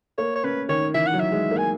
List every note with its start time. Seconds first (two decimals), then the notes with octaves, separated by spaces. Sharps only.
0.18 A#3 C#5
0.36 C#5
0.44 C#4 B4
0.69 D#3 C#5
0.94 E3 E5
1.07 F#5
1.13 F#3
1.20 E5
1.32 G#3
1.51 A#3
1.58 G#5